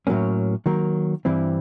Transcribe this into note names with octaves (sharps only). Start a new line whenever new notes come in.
A2 F#3 A#3 C#4
D#3 F#3 A#3
G2 E3 G3 C4 E4